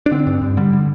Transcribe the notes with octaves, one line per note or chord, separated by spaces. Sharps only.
D4
D3 C4
G2
G2
D3 G3
D3